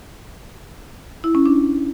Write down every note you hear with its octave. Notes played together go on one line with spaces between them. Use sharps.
E4
C#4
D4